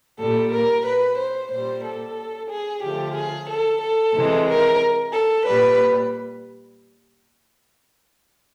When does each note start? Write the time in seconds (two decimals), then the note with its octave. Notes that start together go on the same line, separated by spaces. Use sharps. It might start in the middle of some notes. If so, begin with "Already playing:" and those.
0.20 A#2 G3 A4
0.52 A#4
0.85 B4
1.18 C5
1.51 A#2 G3 C5
1.85 A4
2.51 G#4
2.83 D3 F3 A3 G4
3.16 G#4
3.50 A4
3.82 A4
4.15 C3 E3 G#3
4.48 A#4
5.14 A4
5.47 A#2 G3 B4